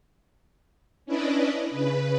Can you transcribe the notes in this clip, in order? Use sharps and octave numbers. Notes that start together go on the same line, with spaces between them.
C#4 D4 E4 B4 D5 D#5
C#3 B4